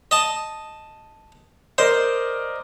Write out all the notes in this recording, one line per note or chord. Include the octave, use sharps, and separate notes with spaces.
D#5 A5
A#4 C5 D5 D#5